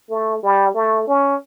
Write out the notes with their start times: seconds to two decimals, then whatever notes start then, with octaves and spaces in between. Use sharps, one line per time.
0.10 A3
0.43 G3
0.74 A3
1.07 C#4